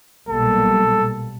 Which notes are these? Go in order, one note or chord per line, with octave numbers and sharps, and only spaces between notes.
B1 A#2 G3 A#3 A4